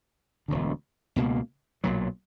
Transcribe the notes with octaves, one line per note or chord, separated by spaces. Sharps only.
E1 D2 D3
C#2 B2 A#3
B1 A#2 F#3